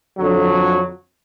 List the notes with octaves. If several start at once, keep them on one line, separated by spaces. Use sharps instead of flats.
F2 D3 F#3